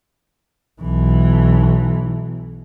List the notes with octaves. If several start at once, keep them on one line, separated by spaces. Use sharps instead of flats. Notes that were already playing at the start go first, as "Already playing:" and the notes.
B1 E3